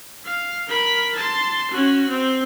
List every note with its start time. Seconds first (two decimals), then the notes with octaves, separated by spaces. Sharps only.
0.25 F5
0.67 A#4 B5
1.16 A5 C6
1.71 C#4 F#4
2.09 C4